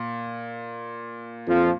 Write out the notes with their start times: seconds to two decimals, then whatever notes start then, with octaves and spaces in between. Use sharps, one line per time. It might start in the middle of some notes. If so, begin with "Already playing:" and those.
Already playing: A#2
1.47 F2 F3